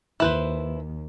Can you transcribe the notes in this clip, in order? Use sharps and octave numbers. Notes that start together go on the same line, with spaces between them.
D#2 E4 B4 C5